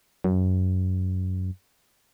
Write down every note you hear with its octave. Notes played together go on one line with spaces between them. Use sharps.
F#2